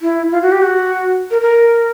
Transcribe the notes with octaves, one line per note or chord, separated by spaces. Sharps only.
E4
F4
F#4
G4
F#4
A#4
A#4